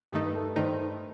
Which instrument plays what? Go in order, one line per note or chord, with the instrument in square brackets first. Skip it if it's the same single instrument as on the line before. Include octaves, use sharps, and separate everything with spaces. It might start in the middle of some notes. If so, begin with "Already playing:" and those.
[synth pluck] G2 D#3 A3 D#4 [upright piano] G4
[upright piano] B4
A4
[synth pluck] G2 D#3 A3 D#4 [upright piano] C5